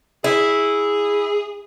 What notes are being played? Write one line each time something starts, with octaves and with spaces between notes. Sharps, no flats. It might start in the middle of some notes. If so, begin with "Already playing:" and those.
E4 G#4